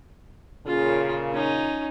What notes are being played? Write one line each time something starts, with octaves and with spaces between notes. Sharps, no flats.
A#2 C#3 F4
C#4 D#4